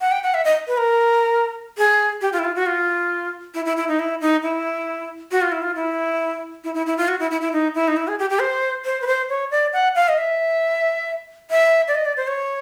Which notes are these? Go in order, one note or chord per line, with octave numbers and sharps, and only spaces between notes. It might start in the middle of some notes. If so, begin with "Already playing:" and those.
F#5
G5
F#5
E5
D#5
B4
A#4
G#4
G4
F4
E4
F4
F#4
F4
E4
E4
E4
D#4
E4
D#4
E4
F#4
F4
E4
F4
E4
E4
E4
E4
F4
F#4
E4
E4
E4
D#4
E4
D#4
E4
G#4
G4
G4
C5
C5
B4
C5
C#5
D5
F#5
F5
D#5
E5
E5
D5
D#5
D5
C5
C#5